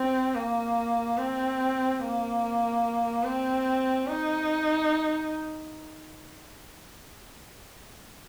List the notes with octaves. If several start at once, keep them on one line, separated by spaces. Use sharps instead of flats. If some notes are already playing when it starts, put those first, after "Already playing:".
Already playing: C4
A#3
C4
A#3
C4
D#4